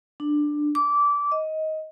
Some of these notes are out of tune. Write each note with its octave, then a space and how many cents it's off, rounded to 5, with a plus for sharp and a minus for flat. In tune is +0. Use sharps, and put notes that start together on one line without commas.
D4 +10
D6 -20
D#5 +15